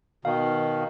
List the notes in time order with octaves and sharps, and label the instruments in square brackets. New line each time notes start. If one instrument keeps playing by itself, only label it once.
[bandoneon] B2 D#3 [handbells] F5